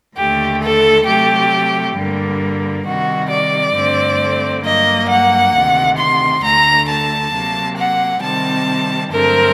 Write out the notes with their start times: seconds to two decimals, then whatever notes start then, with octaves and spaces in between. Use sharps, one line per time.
0.16 D#2 D3 A3 G4
0.61 A4
1.06 C3 F#3 A3 G4
1.95 G2 D3 G3 A#3
2.85 C3 D#3 G3 F#4
3.30 D5
3.74 G2 D3 A3 C4
4.64 G2 F#3 A#3 D#5
5.09 F#5
5.53 D2 C3 D#3
5.98 C6
6.42 D2 D3 A3 A#5
6.88 A5
7.32 C3 F#3 A#3
7.77 F#5
8.22 C3 D#3 G3 C4 A5
9.11 G2 D3 F#3 A3 C4 A#4